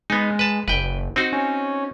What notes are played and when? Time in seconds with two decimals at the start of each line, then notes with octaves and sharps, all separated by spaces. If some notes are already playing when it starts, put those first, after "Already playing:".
0.10 G#3 B3 D#4
0.39 B4 A5
0.68 F#1 B4 G5
1.16 C4 D#4 F#4
1.33 C#4